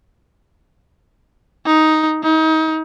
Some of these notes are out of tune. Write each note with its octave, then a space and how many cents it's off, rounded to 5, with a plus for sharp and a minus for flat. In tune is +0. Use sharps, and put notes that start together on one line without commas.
D#4 +5
D#4 +30